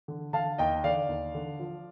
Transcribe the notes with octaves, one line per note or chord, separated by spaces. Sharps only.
D3
D3 F5 A5
D#2 D#5 G5
D3 D5 F5
D#2
D3
F3